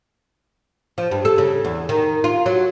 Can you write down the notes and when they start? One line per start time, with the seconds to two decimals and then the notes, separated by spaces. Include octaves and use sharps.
0.98 F3
1.11 G2
1.25 A4
1.38 C#3
1.65 E2
1.89 D#3
2.24 F4
2.46 F#3